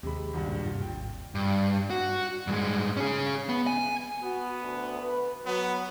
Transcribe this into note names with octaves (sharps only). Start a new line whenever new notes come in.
D#2 C3 G#3 B5
G#1 C#2 G2
A#2
G2 C3 F4
G#1 D#2 G5
G2
F#4
G2 G#3
C#4 G#4
B3
G#5
B3 F#4
D2
B4
F#3 B3